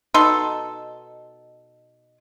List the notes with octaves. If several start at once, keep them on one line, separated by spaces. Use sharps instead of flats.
B2 D#4 A4 C6